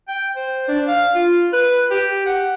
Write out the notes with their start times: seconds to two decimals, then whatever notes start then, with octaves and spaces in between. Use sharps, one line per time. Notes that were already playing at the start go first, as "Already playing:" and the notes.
0.08 G5
0.36 C5
0.68 D4
0.88 F5
1.15 F4
1.53 B4
1.91 G4
2.26 F#5